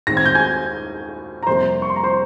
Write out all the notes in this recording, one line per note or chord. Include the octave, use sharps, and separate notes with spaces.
D#2 D#3 G#3 C4 A#6
G#6
G6
G#5 G#6
A#5
F2 C3 G3 A#3 C5 C6
C#6
C6
A#5
C5 C6